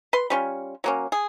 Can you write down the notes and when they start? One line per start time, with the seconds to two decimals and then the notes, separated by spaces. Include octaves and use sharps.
0.13 B4 C6
0.30 G3 C#4 F4
0.84 F#3 A#3 C#4
1.12 G#4